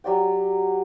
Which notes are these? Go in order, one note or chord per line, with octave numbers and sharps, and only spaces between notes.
F#3 G4 D5 G5